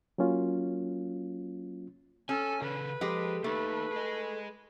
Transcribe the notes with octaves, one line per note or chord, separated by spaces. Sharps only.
F#3 A#3 C#4 F4
C#4 A4 G#5
C#3 A4 B4
F3 G#3 G4 A4
A3 A#3 D#4 B4
G#4 D#5